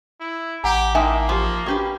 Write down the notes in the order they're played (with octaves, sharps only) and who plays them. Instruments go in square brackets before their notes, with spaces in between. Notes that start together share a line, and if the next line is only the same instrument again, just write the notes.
[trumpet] E4
[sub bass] A1 [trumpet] G4 [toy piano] F#5 G#5 [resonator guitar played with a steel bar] A#5
[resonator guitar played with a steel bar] A2 D#4 E5 [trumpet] A#3 [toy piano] G5 G#5 C6
[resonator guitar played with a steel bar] F3 [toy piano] G4 C6
[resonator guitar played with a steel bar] C#4 G4 B4 [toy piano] D4 F#4 D6